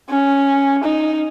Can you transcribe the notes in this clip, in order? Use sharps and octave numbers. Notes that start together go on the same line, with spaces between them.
C#4
D#4